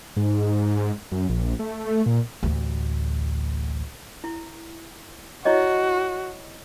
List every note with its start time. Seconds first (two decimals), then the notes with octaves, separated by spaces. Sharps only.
0.17 G#2
1.12 F#2
1.29 A#1
1.59 A3
2.06 A#2
2.43 A1 D2
4.24 E4
5.45 E4 F#4 C#5 D#5